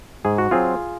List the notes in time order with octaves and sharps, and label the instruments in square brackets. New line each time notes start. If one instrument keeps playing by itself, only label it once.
[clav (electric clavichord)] G#2 G#4
F#4
F#3 C4 F4 G#4